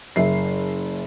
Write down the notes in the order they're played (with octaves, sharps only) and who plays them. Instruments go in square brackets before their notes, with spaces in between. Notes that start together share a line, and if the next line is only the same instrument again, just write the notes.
[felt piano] F#1 E5 C7